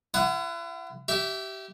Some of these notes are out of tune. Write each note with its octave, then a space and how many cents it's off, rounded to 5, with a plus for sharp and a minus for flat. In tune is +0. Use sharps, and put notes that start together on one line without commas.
E4 +45 F#5 +5 D#6 +0
G4 -25 E5 +0